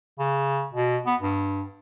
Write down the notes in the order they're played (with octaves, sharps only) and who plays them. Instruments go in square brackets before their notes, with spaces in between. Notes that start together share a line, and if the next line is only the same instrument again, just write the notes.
[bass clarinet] C#3
B2
B3
G2